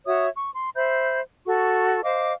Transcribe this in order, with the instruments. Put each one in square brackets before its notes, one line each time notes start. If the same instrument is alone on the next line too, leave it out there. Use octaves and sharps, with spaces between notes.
[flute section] F#4 C#5 E5 D#6
C#6
C6
C5 E5 B5 G6
F#4 A4 C#6
C5 D#5 F5 D6